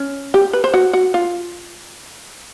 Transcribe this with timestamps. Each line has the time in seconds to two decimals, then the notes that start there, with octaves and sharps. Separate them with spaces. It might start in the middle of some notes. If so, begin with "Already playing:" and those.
Already playing: C#4
0.34 G4
0.53 B4
0.64 C5
0.74 F#4
0.93 F#4
1.14 F4